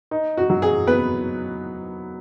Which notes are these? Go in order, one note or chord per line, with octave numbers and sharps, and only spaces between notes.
D#4
F#4
F#3
G#4
B3 B4